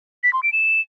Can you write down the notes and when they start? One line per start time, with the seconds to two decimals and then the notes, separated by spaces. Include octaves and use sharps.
0.23 B6
0.33 C6
0.43 D7
0.52 E7